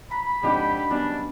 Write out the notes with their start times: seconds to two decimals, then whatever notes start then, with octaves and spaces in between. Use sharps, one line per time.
0.11 A#5 B5
0.43 F2 G#2 D4 D#4 F#4 G4
0.90 D#3 F#3 G3 B3 C#4 D4